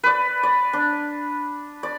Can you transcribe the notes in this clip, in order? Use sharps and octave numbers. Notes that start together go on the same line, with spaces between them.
B4 D5
D5
D4
D5